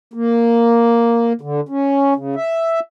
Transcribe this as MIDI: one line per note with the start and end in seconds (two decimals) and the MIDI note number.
0.14 1.33 58
1.41 1.61 50
1.69 2.14 61
2.16 2.35 49
2.36 2.80 76